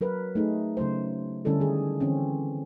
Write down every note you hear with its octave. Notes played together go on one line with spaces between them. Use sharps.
F#3 A#4 B4
A3 D#4 G#4
C#3 F#3 A3 C5
D3 G3 C#4 E4 A4
D#3 G#4
D3 E3 C4 C#4